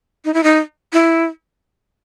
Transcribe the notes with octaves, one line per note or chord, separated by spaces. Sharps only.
D#4
E4
D#4
E4